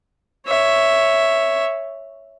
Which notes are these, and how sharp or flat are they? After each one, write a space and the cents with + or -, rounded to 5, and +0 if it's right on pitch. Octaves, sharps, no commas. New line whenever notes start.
C#5 +0 E5 +0